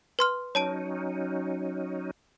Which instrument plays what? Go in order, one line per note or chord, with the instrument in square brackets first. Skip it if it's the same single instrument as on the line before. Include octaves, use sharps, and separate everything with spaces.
[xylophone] B4 C6 F6
[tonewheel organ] F#3 C#4 D#4 [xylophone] C#5 A5 D7